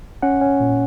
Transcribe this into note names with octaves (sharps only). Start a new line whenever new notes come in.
C#4 F#5
C#4
A#2